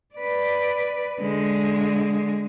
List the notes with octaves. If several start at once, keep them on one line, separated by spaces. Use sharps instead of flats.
B4 D5
D3 G#3